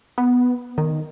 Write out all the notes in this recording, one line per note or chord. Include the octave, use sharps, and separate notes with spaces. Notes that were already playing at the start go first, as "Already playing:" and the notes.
B3
D#3